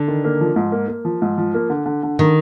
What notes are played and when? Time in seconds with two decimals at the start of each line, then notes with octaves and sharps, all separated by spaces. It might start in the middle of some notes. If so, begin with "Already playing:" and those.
Already playing: D3 D4
0.08 D#3
0.24 A#3
0.40 F3
0.56 G#2
0.72 A#3
0.88 A#3
1.05 F3
1.22 G#2
1.38 F3
1.54 A#3
1.70 D3
1.86 D3
2.03 D3
2.19 D3 D#3